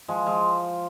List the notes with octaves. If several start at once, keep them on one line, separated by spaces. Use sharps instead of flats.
F3 G#3
F3 G#3